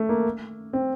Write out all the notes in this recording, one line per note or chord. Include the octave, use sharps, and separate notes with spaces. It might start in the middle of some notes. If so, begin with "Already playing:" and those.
Already playing: A3
A#3
C4